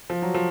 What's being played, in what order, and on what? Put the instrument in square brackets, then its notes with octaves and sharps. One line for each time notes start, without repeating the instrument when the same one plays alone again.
[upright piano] F3
F#3
F3